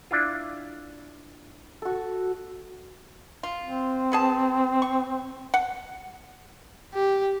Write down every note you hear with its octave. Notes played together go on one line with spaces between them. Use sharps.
D4 E4 F4
F#4 A4
F4
C4
B3 G#4 A5
C#6
F#5
G4